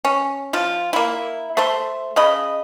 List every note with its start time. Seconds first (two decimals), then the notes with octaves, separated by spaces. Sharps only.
0.05 C#4
0.53 F3 F4
0.93 A#3 E4
1.57 A3 C5 E5 C6
2.16 C#3 D#5 B5